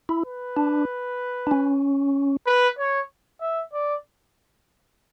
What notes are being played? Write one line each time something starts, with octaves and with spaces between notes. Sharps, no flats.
E4
B4
D4
D4
C#4
B4
C#5
E5
D5